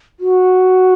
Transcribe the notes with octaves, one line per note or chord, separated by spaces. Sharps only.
F#4